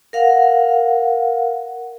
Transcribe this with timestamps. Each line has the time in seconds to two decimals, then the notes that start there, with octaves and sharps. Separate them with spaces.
0.13 A#4 F5 F#5